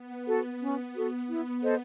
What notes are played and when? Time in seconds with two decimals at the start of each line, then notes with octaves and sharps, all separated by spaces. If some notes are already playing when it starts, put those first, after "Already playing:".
Already playing: B3
0.27 B3 F#4 A4
0.61 C#4
0.95 F#4 A4
1.28 E4
1.62 A4 C5 D#5